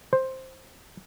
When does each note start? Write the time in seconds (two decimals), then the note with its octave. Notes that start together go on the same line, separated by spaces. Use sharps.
0.13 C5